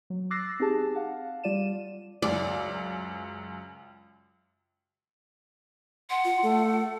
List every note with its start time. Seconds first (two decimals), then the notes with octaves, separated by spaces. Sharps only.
0.10 F#3
0.31 D6 E6 F#6 A6 A#6 C7
0.60 C4 D#4 G4 G#4 A5
0.95 F5 F#5 A5
1.43 G3 F4 D5 D#7 E7
2.22 C#2 F#2 D5
6.10 F#5 C6
6.25 F4
6.43 A3 A4